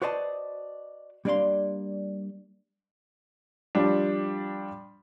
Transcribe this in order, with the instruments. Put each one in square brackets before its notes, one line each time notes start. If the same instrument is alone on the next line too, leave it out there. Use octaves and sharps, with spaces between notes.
[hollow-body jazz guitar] F#4 B4 C5 D5 D#5 A5
G3 A#3 D4 D5 F5 C6
[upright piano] F3 G3 D4